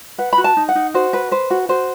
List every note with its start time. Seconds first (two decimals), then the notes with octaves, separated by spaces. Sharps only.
0.18 B4 F#5
0.33 B5
0.38 F#4
0.44 A5
0.57 D#4
0.69 F#5
0.75 D#4
0.94 F#4 C5
1.13 B4
1.31 B4 C5
1.50 F#4
1.69 F#4 C5